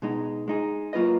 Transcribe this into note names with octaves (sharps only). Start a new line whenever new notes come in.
B2 G#3 D#4
G#3 D#4 G#4
F#3 A#3 F4 B4 D#5